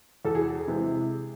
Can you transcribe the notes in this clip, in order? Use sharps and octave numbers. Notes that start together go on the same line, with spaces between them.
E2 A4
G#4
G#4
C3 E3 G#3